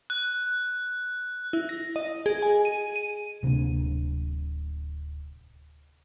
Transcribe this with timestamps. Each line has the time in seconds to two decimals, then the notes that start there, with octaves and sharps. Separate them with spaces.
0.10 F#6
1.53 E4
1.69 A#6
1.96 D#5
2.26 G#4
2.42 G#5
2.65 D#7
2.96 D#7
3.43 D1 C3 A#3 D4